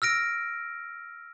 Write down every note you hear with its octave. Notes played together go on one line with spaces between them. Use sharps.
E6 F6 A#6 D7